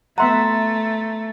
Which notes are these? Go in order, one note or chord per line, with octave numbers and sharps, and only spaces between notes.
A3 B3 E5 F#5 A#5 C6